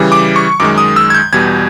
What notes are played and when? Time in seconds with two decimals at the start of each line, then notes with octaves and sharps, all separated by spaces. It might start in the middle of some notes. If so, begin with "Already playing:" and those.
Already playing: C#3 E3 G3
0.12 D6
0.36 C#6
0.60 F#2 D#3 G#3 D6
0.78 D#6
0.96 E6
1.10 G#6
1.15 G6
1.33 E2 B2 G3 G#6